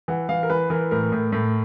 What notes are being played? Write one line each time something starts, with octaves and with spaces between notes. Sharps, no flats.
E3 F#5
E3 F5
A#4
E3 B4
E3 A#4
A2 A#4
A2
A2